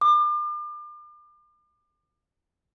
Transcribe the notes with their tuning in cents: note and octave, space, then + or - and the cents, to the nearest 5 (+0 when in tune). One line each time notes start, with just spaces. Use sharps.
D6 +40